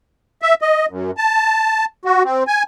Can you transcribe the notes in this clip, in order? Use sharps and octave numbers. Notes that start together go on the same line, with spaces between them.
E5
D#5
F#2
A5
F#4
C4
G#5